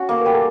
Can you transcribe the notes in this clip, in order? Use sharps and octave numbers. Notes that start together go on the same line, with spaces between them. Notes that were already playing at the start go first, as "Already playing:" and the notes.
Already playing: C#4 F#4
A#3 A4
G3 A#4
A4